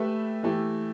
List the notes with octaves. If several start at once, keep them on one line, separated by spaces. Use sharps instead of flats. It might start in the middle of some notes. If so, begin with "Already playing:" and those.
Already playing: A3 G4 B4 E5
E3 A3 G4